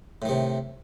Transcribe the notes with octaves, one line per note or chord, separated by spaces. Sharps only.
A2 C3 D#3